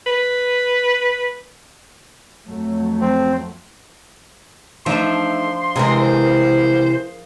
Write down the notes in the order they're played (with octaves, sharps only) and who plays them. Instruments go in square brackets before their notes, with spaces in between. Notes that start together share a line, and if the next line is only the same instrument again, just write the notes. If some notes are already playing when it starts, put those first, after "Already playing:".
[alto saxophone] B4
[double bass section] F2 F#3 A3
[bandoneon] C4
[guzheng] F3 D4 E5 [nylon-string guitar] A3 D#4 [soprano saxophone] C6
[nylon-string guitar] C3 E3 G#3 [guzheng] G#4 A#4
[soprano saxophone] C5